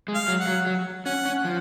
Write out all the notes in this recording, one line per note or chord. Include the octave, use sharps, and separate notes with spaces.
G#3
F5
F#3
F#5
F#3
F#3
C#4 F#5
C#4
F3